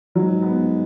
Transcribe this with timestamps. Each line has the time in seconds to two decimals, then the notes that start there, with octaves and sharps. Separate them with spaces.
0.15 G#2 F#3
0.42 B3